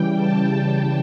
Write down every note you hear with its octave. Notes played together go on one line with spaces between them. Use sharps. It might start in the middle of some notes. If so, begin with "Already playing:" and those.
Already playing: C#3 E3 G3 G5
A5
G5